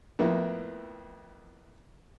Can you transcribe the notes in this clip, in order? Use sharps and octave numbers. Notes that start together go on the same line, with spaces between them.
F2 A2 A#3 B3 E4